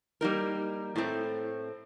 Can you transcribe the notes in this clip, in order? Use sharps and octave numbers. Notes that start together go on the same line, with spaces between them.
G3 A#3 D#4 A#4
A2 A3 C4